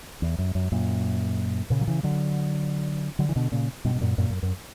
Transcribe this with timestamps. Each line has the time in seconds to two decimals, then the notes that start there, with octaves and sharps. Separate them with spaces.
0.22 E2
0.38 F#2
0.55 F#2
0.72 F#2 A#2
1.70 A#2 C#3
1.81 F#3
1.88 C#3 E3
2.03 D3 F#3
3.19 D3 F#3
3.29 E3
3.36 B2 D3
3.52 A#2 C#3
3.85 G2 B2
3.95 G2
4.01 F#2 A#2
4.18 F#2 A#2
4.30 F#2
4.43 F#2